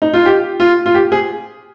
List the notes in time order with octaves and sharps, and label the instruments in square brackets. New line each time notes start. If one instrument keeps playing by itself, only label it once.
[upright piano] D#4
F4
G4
F4
F4
G4
G#4